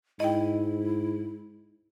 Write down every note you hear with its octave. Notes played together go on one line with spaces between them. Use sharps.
G#2 E4 D#5 G5